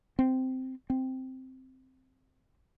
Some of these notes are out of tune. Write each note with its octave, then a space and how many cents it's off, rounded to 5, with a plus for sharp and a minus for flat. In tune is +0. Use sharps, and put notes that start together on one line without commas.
C4 -10
C4 -5